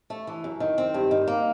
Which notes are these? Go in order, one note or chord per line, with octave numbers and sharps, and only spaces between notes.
A3
E3
F#2
D#3
C4
G2
D#3
A#3